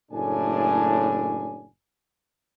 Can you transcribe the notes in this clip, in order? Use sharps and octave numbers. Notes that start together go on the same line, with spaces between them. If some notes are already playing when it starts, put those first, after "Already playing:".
F#1 A2 D4 G#5